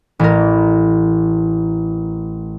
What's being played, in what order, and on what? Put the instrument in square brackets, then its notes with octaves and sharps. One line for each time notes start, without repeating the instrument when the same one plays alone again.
[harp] A1 A#4